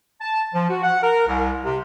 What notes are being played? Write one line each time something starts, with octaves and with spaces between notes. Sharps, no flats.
A5
F3
F#4
F#5
A#4
C2
C3